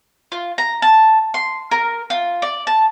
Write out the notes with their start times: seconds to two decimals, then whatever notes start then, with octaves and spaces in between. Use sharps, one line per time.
0.32 F4
0.58 A#5
0.82 A5
1.34 C6
1.71 A#4
2.10 F4
2.42 D5
2.67 A5